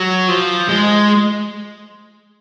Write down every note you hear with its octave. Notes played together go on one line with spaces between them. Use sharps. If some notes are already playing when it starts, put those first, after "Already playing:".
Already playing: F#3
F3
G#3